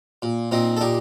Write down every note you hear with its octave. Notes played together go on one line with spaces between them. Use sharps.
A#2
A#2 C4 D#4
A4
A#2 D#4 G4